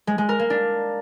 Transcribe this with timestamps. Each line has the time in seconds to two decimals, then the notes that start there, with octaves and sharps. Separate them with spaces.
0.07 G#3
0.18 G#3
0.29 A#4
0.39 A#3
0.50 D4